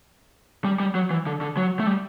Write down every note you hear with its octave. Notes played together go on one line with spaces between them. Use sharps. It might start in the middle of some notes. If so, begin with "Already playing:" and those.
G3
G3
F#3
E3
D3
D3
F#3
A3
G3